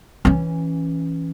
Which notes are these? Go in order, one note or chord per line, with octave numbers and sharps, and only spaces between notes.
E3 C#4